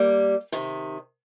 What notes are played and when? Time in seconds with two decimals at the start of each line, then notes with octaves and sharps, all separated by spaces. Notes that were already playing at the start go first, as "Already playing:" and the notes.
Already playing: G3 A#3
0.52 C3 D#3